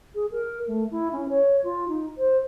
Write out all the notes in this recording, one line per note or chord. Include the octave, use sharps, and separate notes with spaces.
G#4
A#4
A3
E4
C#4
C#5
F4
D#4
C5